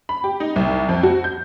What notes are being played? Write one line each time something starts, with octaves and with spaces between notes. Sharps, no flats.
B5
G4
D#4
C2
F2
F#4
G6